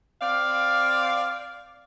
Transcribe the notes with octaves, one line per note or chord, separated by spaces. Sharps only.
C4 D5 F5